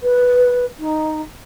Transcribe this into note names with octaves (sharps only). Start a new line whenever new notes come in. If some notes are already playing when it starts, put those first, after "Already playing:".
B4
D#4